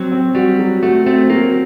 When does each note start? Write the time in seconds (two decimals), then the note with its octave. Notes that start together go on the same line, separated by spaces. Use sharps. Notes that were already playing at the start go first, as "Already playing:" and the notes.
Already playing: F#3 C4
0.12 C4
0.35 G3 F#4
0.59 F#3
0.83 A3 F#4
1.06 A3 C4
1.30 F#3 A#3